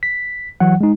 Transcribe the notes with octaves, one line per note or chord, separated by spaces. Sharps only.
B6
E3 F#3 F#5
G#3 D#4